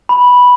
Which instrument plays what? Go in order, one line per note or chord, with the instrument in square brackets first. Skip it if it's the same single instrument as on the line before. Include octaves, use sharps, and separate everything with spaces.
[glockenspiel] B5